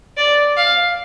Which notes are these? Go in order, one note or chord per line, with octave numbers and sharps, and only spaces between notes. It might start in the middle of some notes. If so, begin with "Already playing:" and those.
D5
F5